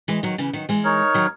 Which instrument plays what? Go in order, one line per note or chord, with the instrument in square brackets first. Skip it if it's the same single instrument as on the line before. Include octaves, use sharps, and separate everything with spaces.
[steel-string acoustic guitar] E3 G#3
D#3 F#3
C#3 E3
D#3 F#3
E3 G#3
[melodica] D#4 A#4 C#5
[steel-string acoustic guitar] D#3 F#3